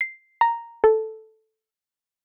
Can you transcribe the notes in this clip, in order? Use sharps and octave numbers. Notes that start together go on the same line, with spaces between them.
C7
A#5
A4